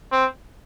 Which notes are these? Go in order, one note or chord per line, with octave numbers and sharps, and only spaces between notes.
C4